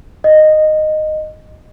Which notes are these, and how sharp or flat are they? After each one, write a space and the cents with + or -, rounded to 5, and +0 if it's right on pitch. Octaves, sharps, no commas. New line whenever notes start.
D#5 -10